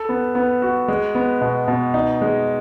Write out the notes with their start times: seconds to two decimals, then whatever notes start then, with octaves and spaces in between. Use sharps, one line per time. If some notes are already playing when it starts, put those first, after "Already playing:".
Already playing: A4
0.09 B3
0.35 B3
0.62 F#4
0.88 G#3
1.15 B3
1.41 B2
1.68 B2
1.94 D#4
2.22 G#3